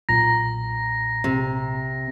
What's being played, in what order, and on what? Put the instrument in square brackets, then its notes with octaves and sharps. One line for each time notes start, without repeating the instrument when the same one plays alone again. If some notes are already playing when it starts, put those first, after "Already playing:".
[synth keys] B1 A#2 A#5 [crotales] A#6
[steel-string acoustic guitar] C3